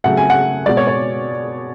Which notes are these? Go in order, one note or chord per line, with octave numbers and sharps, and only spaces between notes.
C#3 F#3 A3 F#5
G#5
F#5
B2 G#3 D5
C#5
C#5